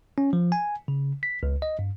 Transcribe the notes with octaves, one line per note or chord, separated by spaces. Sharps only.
C#4
F3
G#5
C#3
B6
C#2
D#5
G2